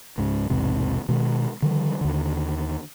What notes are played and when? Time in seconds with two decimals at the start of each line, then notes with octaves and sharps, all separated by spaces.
0.18 C#2 G#2 C#3
0.50 B1 E2 G#2 C3
1.09 B2 D#3 G#3
1.62 D3 D#3 F3 G3
2.01 D#2 D3